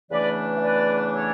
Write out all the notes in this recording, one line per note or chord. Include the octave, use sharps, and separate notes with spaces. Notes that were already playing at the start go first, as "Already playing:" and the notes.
E2 C#3 E3 A3 D4 B4 D5
E5
B4 D5
A4 C#5